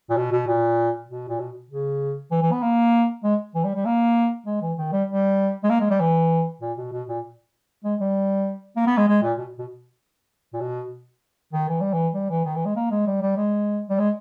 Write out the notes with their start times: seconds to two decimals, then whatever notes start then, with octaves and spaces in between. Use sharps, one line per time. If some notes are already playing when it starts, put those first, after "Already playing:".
0.10 A#2
0.17 B2
0.32 B2
0.47 A#2
1.08 B2
1.28 A#2
1.39 B2
1.70 C#3
2.31 E3
2.42 E3
2.52 B3
2.62 A#3
3.24 G#3
3.55 E3
3.64 G3
3.75 G3
3.85 A#3
4.46 G#3
4.62 E3
4.78 D#3
4.92 G3
5.08 G3
5.63 G#3
5.70 A#3
5.80 G#3
5.90 G3
6.00 E3
6.61 A#2
6.77 B2
6.92 B2
7.08 A#2
7.84 G#3
8.00 G3
8.76 A#3
8.87 B3
8.97 G#3
9.08 G#3
9.22 A#2
9.38 B2
9.58 B2
10.53 A#2
10.60 B2
11.53 D#3
11.68 E3
11.81 G3
11.93 E3
12.14 G3
12.30 E3
12.45 D#3
12.55 E3
12.65 G#3
12.76 A#3
12.91 G#3
13.06 G3
13.22 G3
13.37 G#3
13.89 G3
13.99 G#3